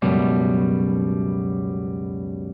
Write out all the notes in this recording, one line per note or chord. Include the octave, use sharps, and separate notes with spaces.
C#2 F#2 B2 G3